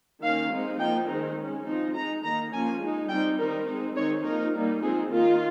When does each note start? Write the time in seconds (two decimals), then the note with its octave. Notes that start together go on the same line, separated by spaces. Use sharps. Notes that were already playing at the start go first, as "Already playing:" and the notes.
0.22 D#3 A#3 C#4 F5
0.51 G#3 C4 D#4
0.79 F3 A#3 D#4 G5
1.08 D#3 G#3 C4 D#4
1.37 G#3 C#4
1.65 F3 C4 D#4
1.95 G#3 D#4 A#5
2.23 D#3 A#3 D#4 A#5
2.52 F3 A#3 C#4 G#5
2.80 G#3 D#4
3.09 G3 C4 D#4 G5
3.38 D#3 G3 C4 D#4 A#4
3.67 G#3 C4 D#4
3.95 D#3 G#3 C4 D#4 C#5
4.24 F3 A#3 D#4 A#4
4.53 G3 A#3 D#4
4.82 F3 G#3 C4 D#4 G#4
5.11 D#3 A#3 D#4 F4